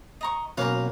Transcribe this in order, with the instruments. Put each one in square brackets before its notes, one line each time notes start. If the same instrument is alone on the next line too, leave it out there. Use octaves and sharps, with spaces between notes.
[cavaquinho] D#5 A#5 C#6
[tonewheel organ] B2 F#3 [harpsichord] A#3 C#4 B4 [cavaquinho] F5 G5 A#5